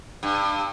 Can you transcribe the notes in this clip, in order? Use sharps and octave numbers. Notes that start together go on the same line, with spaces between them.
G2